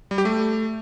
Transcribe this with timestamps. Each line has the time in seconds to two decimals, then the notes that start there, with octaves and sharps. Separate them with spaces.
0.11 G3
0.18 G4
0.25 A3